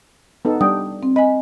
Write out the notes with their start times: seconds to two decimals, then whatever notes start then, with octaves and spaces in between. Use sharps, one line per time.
0.45 B3 D#4 A4
0.61 G3 D4 G5 D#6
1.03 C4
1.16 D#5 G#5 B5